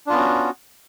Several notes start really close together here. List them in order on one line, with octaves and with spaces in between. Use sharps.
D4 F4 B3 C#4 F#4